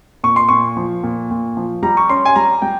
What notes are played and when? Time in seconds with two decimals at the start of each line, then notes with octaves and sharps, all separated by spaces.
0.24 A#2 C#6
0.36 C6
0.49 A#2 C#6
0.77 F3
1.04 A#2
1.31 A#2
1.57 F3
1.83 G3 A#5
1.97 C#6
2.09 C#4 C6
2.25 G#5
2.36 G3 A#5
2.62 G3 G5